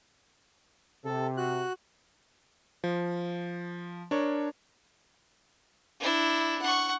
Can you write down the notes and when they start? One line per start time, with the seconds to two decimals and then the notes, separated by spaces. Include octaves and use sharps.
1.05 C3 A4
1.37 F#4 F#6
2.84 F3
4.11 D4 A#4 C#5
6.00 D4 E4
6.62 F#5 C#6